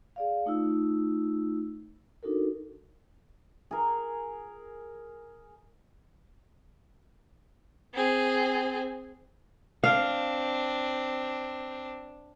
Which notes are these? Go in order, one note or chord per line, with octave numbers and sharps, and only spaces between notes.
G#4 D5 F5
A3 D#4 F4 E6
D4 D#4 F#4 A4 A#4
G#4 A#4
C4 G#4
C4 D4 F5